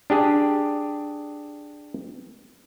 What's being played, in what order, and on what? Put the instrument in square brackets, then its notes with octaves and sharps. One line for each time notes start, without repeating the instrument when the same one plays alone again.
[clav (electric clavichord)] D4 G4 G#4